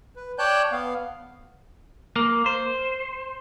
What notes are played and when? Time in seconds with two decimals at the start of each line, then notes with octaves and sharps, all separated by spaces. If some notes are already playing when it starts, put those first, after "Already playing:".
0.16 B4
0.38 C#5 D5 G5 A5 F#6 G6
0.72 B3 F5
2.16 A#3
2.46 C5